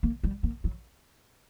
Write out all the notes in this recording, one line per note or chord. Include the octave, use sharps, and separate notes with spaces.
A#3
G3
A#3
F#3